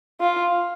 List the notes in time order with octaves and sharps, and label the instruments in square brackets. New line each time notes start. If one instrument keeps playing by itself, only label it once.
[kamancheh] F4